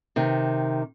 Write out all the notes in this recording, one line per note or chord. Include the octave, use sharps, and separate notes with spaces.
C3 D#3